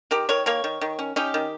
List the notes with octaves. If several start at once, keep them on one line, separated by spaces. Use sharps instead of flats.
D#3 G4 A#4
D#3 A#4 C#5
A#3 A#4 C#5
D#3
D#3
C#4
C#4 D#4 G4
D#3